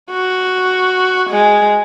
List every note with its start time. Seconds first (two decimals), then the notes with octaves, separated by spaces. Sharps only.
0.11 F#4
1.30 G#3